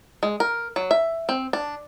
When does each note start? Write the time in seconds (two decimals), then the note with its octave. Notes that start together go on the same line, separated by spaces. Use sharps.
0.23 G#3
0.40 A#4
0.76 F#3
0.91 E5
1.29 C4
1.53 D4